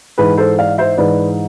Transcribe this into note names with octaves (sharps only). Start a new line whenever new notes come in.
G#2 E3 G#4 B4
A4 C5
D5 F5
C5 E5
G#2 E3 B4 D5